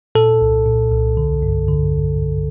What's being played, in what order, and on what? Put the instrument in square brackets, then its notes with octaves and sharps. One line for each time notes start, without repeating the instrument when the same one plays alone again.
[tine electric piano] A#2 A4
C2
A#2
C2
D3
G2
D3